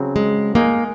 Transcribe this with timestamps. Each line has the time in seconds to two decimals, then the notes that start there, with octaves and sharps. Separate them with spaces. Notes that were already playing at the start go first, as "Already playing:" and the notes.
Already playing: C#3 F#3 C4
0.16 G#3
0.55 G#3 A#3 D#4 G#4